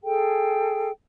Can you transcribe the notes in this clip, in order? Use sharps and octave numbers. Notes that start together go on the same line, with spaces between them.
G#4 A4 G5